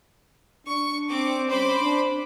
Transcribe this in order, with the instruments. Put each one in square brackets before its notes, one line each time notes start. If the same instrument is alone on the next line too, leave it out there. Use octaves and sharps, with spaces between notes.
[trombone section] D4 [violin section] C#6
[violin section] C4 D6
[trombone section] G3 C4 C#4 [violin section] C5 B5 D6
[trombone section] D4